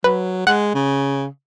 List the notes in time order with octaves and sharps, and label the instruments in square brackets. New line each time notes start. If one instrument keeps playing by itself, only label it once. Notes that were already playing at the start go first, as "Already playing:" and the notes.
[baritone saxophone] F#3 [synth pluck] B4
[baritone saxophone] G#3 [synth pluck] F#5
[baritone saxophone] C#3